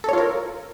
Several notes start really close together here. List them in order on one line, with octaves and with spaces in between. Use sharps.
A4 C#5 F4 A#4